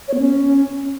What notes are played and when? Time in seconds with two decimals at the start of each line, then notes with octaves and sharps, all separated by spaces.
0.08 C#5
0.14 B3
0.19 C#4